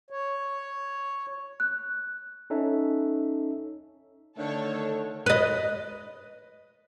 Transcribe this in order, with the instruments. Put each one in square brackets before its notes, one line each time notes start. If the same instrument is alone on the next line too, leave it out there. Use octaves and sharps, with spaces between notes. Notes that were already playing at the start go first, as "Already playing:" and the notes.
[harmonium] C#5
[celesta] F#6
[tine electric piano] C#4 D#4 A4 C#5 E5
[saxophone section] D3 D#3 A3 [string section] A4 C#5
[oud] B4 D#5